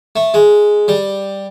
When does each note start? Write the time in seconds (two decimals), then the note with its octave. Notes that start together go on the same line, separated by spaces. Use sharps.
0.16 A3
0.34 G#3
0.88 G3